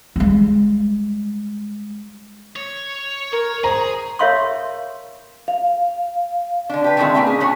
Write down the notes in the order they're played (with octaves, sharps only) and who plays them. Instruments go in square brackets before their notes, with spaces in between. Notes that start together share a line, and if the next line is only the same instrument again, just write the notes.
[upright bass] G3 G#3
[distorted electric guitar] C#5
[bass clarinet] A#4 [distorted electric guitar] C#5
[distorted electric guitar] G#4 [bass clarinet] C5 [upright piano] A#5
[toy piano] A#4 C#5 E5 F5 C6 C#6
[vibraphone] F5
[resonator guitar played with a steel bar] D3 D4
G4 B4
D3 D#3 G#3 A3 C4 E4
A#3 C#4 D4 E4 E5
G#4
A#2 A3 C#4 F#4 C#5